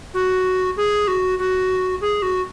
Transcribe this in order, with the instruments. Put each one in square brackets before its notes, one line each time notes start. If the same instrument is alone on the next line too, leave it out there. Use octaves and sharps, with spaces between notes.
[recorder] F#4
G#4
F#4
F#4
G#4
F#4